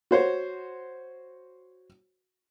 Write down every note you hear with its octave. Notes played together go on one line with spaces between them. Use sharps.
F#4 C5 C#5